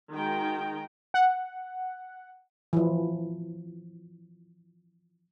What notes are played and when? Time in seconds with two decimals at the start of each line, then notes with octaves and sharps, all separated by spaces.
0.12 D#3 G#3 D#4 F#4 G5 A#5
1.14 F#5
2.73 E3 F3